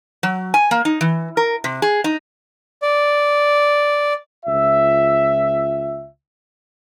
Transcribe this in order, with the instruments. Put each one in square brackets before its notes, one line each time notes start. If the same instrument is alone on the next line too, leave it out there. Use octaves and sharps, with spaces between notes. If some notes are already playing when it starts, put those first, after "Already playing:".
[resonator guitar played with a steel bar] F#3
G#5
A#3
D#4
E3
A#4
C3
G#4
D#4
[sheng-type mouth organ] D5
[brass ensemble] C#2 F4 E5